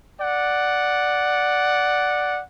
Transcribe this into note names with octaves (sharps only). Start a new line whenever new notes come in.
D5 F#5